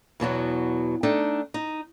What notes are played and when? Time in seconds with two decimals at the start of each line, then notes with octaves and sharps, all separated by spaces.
0.20 E2 B2 E3 F#3
1.03 A3 D4 D#4 G5
1.54 D#4